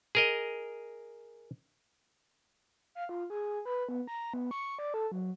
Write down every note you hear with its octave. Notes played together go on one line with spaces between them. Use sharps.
G#4 A#4 D#5
F5
F4
G#4
B4
B3
A#5
B3
C#6
D5
A4
F#3